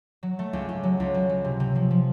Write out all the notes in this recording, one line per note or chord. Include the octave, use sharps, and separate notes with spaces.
F#3
A3
C#2
C#2
F#3
C#2
F#3
F#3
C3
C3
F3
F3